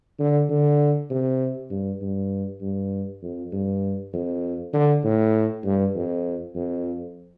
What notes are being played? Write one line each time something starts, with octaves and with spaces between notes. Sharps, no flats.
D3
D3
C3
G2
G2
G2
F2
G2
F2
D3
A2
G2
F2
F2